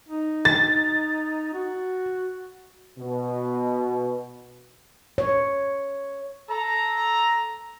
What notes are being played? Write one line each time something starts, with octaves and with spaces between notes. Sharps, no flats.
D#4
A6
F#4
B2
C#5
A4 A#5